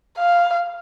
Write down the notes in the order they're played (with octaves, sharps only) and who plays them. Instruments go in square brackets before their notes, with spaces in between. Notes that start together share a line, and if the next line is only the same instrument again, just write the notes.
[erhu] F5